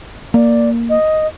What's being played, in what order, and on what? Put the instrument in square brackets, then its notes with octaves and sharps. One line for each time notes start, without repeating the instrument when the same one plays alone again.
[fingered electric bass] A#3 [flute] D5
[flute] D#5